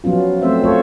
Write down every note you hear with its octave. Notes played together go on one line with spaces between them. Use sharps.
F3 F#3 B3 C#4 F4
A3 C4 C5 E5
A3 F4 A4 C5 C#5